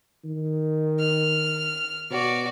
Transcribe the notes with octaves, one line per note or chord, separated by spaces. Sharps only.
D#3
F6
B2 F#4 D5